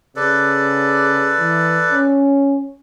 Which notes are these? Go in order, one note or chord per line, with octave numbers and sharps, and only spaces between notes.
C#3 A4 B4 D5
E3
C#4